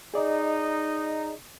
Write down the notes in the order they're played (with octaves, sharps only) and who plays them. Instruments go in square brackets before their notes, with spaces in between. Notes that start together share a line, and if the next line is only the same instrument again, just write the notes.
[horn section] D#4 [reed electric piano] G#4 D5 D#5